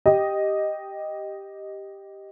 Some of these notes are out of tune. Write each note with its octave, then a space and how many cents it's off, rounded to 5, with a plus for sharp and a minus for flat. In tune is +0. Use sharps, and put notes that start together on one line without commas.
G4 +0 D#5 +0